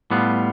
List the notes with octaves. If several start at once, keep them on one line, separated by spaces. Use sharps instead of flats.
A2 G3 B3 F4